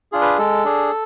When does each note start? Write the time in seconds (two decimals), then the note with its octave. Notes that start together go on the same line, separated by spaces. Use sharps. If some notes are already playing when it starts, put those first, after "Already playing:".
0.12 D4 F4 G#4
0.22 B4
0.38 G#3 A4
0.64 D4 G#4